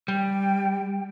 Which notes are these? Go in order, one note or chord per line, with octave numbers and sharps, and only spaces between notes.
G3 G5